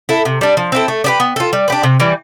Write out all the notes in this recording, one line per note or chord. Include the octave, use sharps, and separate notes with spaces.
E4 A4
C3
G3 D4
F3
C4 E4 A4
A3
D4 G4 B4
B3
F4 A4
G3
D4 G4 B4
C3
E3 G3